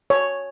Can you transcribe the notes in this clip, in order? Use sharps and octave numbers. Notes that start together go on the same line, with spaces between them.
C#5